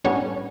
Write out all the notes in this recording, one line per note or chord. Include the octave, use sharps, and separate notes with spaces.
A2 G3 B3 C#4 D4 C#5